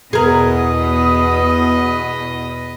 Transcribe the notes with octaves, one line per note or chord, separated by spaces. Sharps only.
E2 B2 G#4 A#4 B4 D#5 D#6